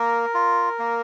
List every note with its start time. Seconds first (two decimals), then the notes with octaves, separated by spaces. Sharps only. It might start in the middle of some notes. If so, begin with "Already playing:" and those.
Already playing: A#3 A#4
0.34 F4
0.79 A#3